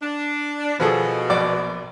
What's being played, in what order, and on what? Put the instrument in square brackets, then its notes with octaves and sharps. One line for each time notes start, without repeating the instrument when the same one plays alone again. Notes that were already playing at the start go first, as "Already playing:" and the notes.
[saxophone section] D4
[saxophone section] B2 [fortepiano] F3 G#4 A4
[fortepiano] A#1 D5 D6